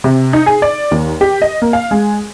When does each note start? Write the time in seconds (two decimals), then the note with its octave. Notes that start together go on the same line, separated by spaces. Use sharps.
0.04 C3
0.33 D#4
0.46 G#4
0.62 D5
0.91 D#2
1.21 G4
1.42 D#5
1.62 A#3
1.73 F5
1.91 G#3